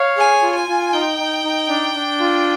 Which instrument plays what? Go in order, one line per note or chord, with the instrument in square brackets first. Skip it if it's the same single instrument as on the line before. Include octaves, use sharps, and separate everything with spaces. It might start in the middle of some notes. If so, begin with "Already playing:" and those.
Already playing: [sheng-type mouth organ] C#5 F5
[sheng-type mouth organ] G#4 [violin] G#5
[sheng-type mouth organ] F4
[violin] G#5
[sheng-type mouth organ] F4
[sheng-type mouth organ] D#4 [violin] G5
[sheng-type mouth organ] D#4
D#4
D4
D4
F4